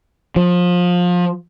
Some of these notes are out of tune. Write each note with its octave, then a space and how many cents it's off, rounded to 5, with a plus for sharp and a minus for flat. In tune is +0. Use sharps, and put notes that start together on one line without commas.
F3 +25